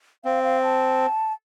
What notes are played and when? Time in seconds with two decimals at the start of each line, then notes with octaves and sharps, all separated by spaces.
0.24 C4 F5
0.44 F5
0.63 A5